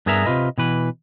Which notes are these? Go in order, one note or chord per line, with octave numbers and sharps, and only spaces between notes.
G2 B3 G#4 A#4 E5 A#5
C3 F3 F4 B4 D#5
B2 E3 B4